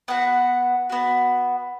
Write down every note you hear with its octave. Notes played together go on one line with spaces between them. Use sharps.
B3 F#4 F#5
B3 F#4